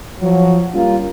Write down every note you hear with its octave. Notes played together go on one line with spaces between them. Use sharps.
F3 F#3
G3 A#3 C#4 F4